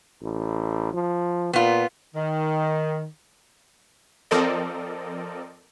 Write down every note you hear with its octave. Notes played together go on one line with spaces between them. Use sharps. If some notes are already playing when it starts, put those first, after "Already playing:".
A1
F3
A#2 B3 F4
D#3
F3 C4 A4 A#4 D5 D#5